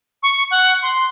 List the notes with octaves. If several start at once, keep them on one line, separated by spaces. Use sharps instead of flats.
C#6
F#5
C6